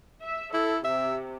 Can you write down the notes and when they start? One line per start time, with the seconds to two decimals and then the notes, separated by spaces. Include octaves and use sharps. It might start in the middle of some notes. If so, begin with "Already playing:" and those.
0.21 E5
0.54 E4 A4
0.85 C3 E5